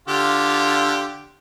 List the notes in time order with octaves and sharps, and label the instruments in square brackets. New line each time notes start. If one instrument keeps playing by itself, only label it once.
[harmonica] D3 F4 G4